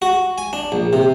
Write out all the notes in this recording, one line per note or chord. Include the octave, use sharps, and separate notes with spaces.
F#4
G#5
D4
A#1
C3